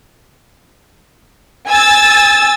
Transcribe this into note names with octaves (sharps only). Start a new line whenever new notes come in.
G#5 E6 A6